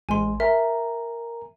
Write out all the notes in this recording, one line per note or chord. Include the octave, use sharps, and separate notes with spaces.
A1 G#3 G#5 C6
A#4 E5 G#5 A#5